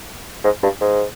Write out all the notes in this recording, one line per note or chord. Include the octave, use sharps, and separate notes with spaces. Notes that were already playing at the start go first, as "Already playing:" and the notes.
G#2
G2
G#2